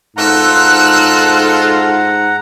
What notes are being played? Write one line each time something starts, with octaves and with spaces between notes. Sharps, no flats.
G#2 F4 A4 F#5 A#5 E6 F#6